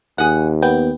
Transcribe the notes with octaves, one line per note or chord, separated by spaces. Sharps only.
D#2 G#4 F#5
B3 G5